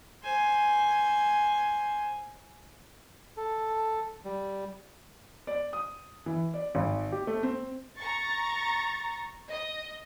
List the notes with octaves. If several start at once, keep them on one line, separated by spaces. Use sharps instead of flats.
C5 G#5
A4
G3
D5
D#6
E3
D5
G#1
G4
A3
C4
A#5 C#6 A6
D#5